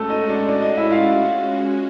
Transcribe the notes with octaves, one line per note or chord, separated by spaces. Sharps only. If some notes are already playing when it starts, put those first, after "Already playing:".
Already playing: G#3 A3 C#4 F#4 A4
D#4 D#5
D4 D5
D4 D5
D#4 D#5
E4 E5
F4 F5